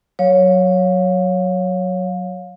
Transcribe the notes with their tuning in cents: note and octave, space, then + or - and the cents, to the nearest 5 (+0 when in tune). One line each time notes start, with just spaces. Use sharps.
F#3 +0 C#5 +0 F5 +30